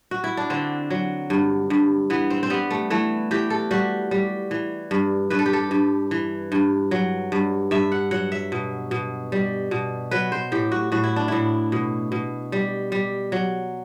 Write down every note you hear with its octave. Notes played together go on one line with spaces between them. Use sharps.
F#4
E4
D4
D3 C4
F#3
G2
G2
E3 B3
C4
C4
G3 B3
A3
E3 A3
E3 G4
A4
G3 F#4
G3
E3
G2
G2 B4
A4
G4
A4
G2
E3
G2
F#3
G2
G2 E5
F#5
F#3 F#5
E5
B2
B2
G3
B2
F#3 B4
C5
A2 G4
F#4
A2 F#4
E4
D4
A2 E4
B2
B2
G3
G3
F#3